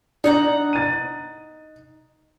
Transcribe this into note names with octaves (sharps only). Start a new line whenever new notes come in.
D4 D#4 F#5 A#5
A6 D#7